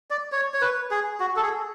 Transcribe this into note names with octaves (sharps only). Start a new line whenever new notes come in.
D5
C#5
C#5
B4
G#4
F#4
A4
G#4